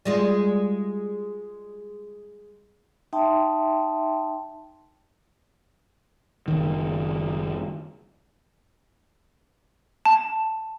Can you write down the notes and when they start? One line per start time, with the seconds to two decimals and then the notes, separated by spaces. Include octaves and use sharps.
0.05 G3 G#3 F4
3.13 D#4 E5 G5 A5 C6
6.48 F#1 D#3
10.06 A5